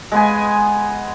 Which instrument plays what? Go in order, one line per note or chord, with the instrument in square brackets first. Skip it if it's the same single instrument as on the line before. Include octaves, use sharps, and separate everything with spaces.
[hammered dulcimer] G#3 B3 G#5